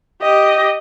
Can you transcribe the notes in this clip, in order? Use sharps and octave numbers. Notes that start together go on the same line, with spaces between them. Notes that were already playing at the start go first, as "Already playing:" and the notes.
G4 D#5